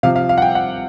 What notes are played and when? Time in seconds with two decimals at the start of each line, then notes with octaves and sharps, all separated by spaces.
0.03 C3 F3 F5
0.16 F5
0.29 F5
0.38 F#5
0.42 G5
0.55 F#5